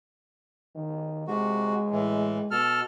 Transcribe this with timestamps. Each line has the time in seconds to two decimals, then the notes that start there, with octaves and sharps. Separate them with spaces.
0.75 D#3
1.28 C3 G#3 F#4
1.91 A2 E3
2.51 B2 A4 F6